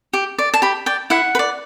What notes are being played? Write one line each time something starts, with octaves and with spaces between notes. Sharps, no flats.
G4
D5
A5
G4 B5
D5 G5
E4 F#5
B4
D5